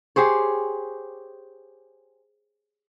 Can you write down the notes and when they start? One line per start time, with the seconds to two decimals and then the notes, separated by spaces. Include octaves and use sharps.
0.16 G4 G#4 C5 C#5